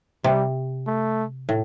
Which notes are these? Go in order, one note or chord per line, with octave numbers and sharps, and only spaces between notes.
C3 G3
A3
A2